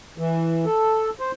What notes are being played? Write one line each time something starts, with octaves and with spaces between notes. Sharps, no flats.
E3
A4
C5